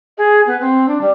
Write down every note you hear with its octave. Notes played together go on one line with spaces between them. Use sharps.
G#4
B3
C4
D4
G3